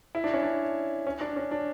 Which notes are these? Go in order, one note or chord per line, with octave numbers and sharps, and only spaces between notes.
E4
D4
C#4
D4
C#4
D4
C#4
D4